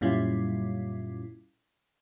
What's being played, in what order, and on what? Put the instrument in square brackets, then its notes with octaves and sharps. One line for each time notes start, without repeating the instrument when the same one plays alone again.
[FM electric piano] F#2 A#2 G3 C#4 E4 F4